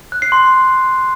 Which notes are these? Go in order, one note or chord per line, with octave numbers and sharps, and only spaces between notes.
F#6
C7
C6